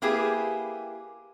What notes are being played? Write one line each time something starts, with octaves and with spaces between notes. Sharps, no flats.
A#3 E4 G4 G#4 B4